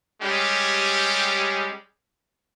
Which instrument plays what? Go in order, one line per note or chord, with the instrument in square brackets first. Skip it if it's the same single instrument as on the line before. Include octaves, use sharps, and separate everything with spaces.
[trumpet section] G3 G#3 C#4 G4